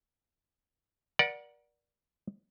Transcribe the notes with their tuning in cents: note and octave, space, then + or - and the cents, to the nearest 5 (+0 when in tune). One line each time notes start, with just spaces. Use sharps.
A#4 +40 D5 +0 F#5 +0